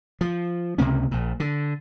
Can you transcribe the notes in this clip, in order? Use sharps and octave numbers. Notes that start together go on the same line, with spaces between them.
F3
C#2 C3 A#3 C#4
A#1 A#2
D3